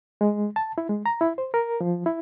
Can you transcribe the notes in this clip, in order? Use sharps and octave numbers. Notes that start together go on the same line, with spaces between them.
G#3
A5
E4
G#3
A#5
E4
C5
A#4
F3
E4